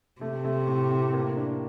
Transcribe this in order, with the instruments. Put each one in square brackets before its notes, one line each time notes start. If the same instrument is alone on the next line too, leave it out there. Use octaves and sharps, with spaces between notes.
[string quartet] C3 [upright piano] A3
[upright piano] A3
A2
A2
A#3
D4